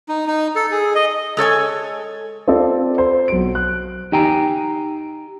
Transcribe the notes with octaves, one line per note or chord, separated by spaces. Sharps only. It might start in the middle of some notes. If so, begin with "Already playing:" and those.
D#4
D#4
A4
G#4
D#5
G#3 A4 C#5 G#5
C4 F4 A4 D5
C5
B1 D7
F#6
D#4 G4 G5 G#5 A#5